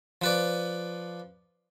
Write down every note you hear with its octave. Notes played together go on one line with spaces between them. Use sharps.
F3 B4 D5